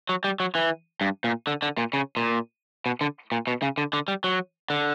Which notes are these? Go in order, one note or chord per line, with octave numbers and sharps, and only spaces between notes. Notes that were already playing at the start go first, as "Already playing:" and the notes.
F#3
G3
F#3
E3
G2
A#2
D3
D3
A#2
C#3
A#2
B2
D3
A#2
B2
C#3
D3
D3
G3
F#3
D3